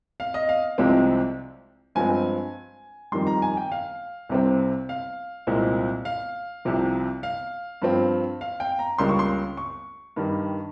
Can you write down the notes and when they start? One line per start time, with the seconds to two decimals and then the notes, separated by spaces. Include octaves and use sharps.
0.20 F5
0.34 D#5
0.49 F5
0.78 C2 C3 F3 G#3 C4
1.95 G2 F3 G#3 C4 G#5
3.12 F2 D#3 G3 C6
3.27 A#5
3.42 G#5
3.57 G5
3.72 F5
4.29 C2 C3 G3 C4
4.89 F5
5.47 C2 A#2 G#3 C4
6.05 F5
6.65 C2 C3 F3
7.23 F5
7.82 G2 F3 C4
8.41 F5
8.60 G5
8.79 A#5
8.98 C#2 C#3 G3 A#3 C6
9.09 C#6
9.19 C6
9.57 C#6
10.16 G2 D#3 G3